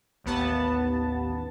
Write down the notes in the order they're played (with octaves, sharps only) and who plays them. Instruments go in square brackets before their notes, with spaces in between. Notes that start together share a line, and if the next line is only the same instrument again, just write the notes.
[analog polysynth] A1 D#2 B3 A5